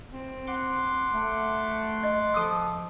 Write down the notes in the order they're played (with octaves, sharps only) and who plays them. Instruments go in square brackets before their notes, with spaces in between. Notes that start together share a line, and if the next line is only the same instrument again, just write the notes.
[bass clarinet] C4
[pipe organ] F#5 C6 D6
[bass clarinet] A3
[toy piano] D#5
[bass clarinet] F3 [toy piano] A4 D#6 E6